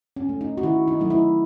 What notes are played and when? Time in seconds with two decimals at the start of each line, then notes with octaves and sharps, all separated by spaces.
0.16 C#4
0.29 A3
0.41 D#4
0.58 F#4
0.63 D#3 E4
0.88 D#4
1.00 F#3 A3 D#4
1.10 E4